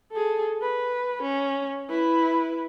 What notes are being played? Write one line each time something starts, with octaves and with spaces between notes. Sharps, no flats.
G#4 A4
B4
C#4
E4 B4